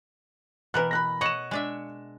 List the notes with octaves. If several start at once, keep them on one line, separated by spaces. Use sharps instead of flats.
B2 E3 A#4 B4 F#6
B5 F#6 A#6
C#5 D#5 F#5 C#6 E7
G#3 D4 E5